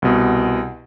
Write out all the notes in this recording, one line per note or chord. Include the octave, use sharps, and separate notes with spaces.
C2 B2